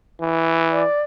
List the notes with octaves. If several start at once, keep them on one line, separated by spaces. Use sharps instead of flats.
E3
D5